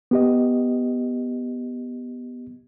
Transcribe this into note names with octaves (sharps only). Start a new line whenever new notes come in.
B3 G4 D#5